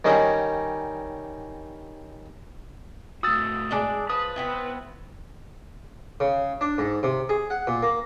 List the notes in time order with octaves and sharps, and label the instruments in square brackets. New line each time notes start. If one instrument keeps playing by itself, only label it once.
[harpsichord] D#3 G3 C#4 D#4
[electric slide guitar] A2 F#4 [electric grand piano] D#6 E6 A6
[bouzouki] G#3 D4 D5
[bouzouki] F3 [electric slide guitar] B4 [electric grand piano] D#6
[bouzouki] B3 C4 E4
[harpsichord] C#3
D4
G#2
C3
G#4
F#5
A#2
A#3